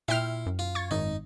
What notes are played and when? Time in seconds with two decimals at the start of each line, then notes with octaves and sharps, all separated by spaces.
0.08 A#2 E4 E5 G5 C6 F6
0.46 F#2
0.59 F4
0.75 C#6 G#6 A6
0.91 G#1 D#4